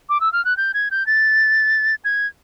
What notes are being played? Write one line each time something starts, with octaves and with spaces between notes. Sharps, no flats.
D6
E6
F6
F#6
G6
G#6
G6
A6
G#6